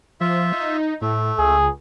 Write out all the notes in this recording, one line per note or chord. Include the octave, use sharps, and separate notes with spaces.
F3 F4 E5
D#4
A2 A3
C#2 G#4